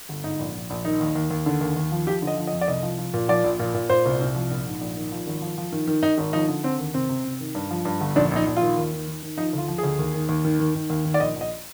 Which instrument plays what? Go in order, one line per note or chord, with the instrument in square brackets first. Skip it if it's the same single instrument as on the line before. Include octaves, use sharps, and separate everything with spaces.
[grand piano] G1
G#2 D#4
A#1
A#1
A#1
D#3 D#4
D#2
D#2
D#2
D3
D#2
D#2
F3
F3 G4
D3
D#5
F3
D#5
F2
D5
C2 D#5
F3
F3
A#2
F3 D5
A#1
A#2
A#2
A#2 C5
C2
C2
F3
A#1
G#2
A#1
D#3
F3
G#1
F3
F3
D#3
D#3
D#3 D#4
G#1
F3 D#4
D3
D3 C4
D#2
C3 C4
C3
C3
D#3
G2
F3
G2
G1
A#1 D4
A#1 D#4
A#1
F4
D#3
D#2
D#3
D#3
D#3
F3 D#4
D2 F4
F3
G#4
D2
D#2
D#3
D#2
D#3
D#3
D#3
D#2
D#3
D5
A#1 D#5
A#1
D#5